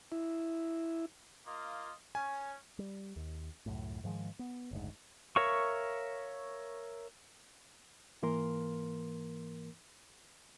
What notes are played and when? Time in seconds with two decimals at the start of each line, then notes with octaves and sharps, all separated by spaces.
0.12 E4
1.46 A#3 F4 D#5
2.15 C#4 G#5
2.79 G3
3.16 D#2
3.66 C#2 F#2 A2
4.04 G#2 D#3 F3 G#3
4.39 B3
4.71 F#1 D2 G#2
5.36 A#4 C#5 E5 F5 C#6
8.22 G#2 E3 A#3 A#4 C6